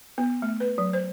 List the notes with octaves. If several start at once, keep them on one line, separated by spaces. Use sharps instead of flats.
B3
A3
B4
F#3
C5